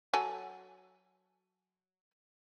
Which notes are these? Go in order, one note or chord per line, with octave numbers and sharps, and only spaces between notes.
F#3 A4 G#5